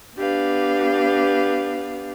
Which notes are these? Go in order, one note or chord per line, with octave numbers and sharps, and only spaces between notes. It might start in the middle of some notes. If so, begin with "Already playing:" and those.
B3 D4 G4 B4 F5